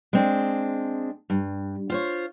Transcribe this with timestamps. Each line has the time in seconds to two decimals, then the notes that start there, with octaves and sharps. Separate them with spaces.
0.13 G#3 C4 D4
1.30 G2
1.90 F4 C5 C#5